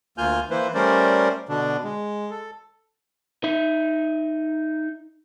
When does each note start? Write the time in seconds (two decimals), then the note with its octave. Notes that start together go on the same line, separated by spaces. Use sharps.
0.18 D2 A#3 F4 G#5 F6 G6
0.50 E3 A#3 E4 B4 C5
0.74 G3 A3 C#4 A#4 C5 D5
1.49 B2 D3 D4
1.84 G#3
2.30 A4
3.44 D#4 E5